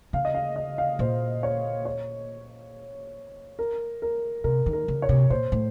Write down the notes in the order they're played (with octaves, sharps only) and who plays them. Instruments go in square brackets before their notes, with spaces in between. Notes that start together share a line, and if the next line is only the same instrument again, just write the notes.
[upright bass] C#3 [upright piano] F5
[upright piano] D#5
F5
D#5
F5
[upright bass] A#2 [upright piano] C5
[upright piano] C#5
C#5
A#4
A#4
[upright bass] C3 [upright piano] A#4
[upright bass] D#3
[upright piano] A#4
[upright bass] C#3
[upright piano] C#5
[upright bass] C3
[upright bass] A#2 [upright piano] C5
[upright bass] A2